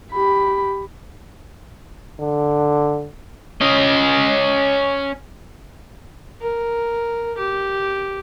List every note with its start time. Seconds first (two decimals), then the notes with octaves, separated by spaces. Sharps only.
0.12 G4 B5
2.21 D3
3.61 C#4 D#5
6.41 A#4
7.38 G4